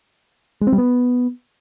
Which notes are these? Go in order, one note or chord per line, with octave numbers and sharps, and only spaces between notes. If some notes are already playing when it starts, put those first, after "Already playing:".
G#3
C4
G3
B3